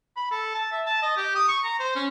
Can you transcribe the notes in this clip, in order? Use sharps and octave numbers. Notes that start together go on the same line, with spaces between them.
B5
A4
A5
E5
A5
D#5
G4
D#6
C#6
A#5
C5
C#4